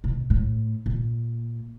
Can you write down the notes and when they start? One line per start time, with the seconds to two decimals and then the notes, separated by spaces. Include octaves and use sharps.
0.04 B2
0.30 A2
0.86 A#2